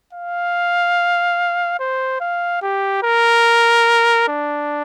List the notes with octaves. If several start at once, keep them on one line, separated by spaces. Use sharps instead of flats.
F5
C5
F5
G4
A#4
D4